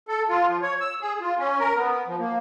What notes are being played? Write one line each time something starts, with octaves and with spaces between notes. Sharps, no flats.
A4
F4
F3
C#5
E6
G#4
F4
C#4
A#4
B3
F3
A#3